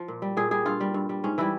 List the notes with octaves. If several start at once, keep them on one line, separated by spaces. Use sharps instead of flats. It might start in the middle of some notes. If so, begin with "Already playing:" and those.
Already playing: F3
A#2
G3
A#2 G#4
G3 G#4
G2 F4
G3
G2
G3
G#2 C#4
E3 G3 E4